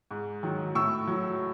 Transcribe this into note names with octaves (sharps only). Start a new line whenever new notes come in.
G#2
D#3 F#3
A2 C#6 E6
F#3